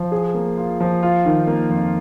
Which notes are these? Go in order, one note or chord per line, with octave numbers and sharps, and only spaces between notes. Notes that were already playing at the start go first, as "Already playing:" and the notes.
Already playing: F3
G#4
A#3
F4
F3
F4
D#3
A#3
F2